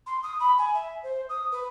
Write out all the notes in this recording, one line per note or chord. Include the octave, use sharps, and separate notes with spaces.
C6
D#6
B5
G#5
E5
C5
D#6
B4